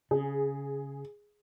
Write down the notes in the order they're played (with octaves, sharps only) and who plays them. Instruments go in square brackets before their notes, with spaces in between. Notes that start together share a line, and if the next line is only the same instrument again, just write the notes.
[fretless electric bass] C#3 [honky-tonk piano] G#4